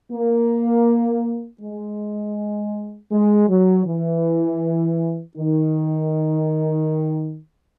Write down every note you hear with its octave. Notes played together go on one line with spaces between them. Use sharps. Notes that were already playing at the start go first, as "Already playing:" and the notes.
A#3
G#3
G#3
F#3
E3
D#3